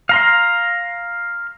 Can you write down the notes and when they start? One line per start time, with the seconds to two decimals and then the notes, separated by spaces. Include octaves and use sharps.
0.09 F5 A#5 C6